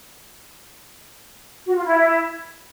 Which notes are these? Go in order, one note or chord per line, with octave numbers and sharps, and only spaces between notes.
F#4
F4
E4